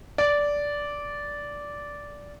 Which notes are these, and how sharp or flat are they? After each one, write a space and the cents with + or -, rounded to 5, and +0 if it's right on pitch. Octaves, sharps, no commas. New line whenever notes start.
D5 -10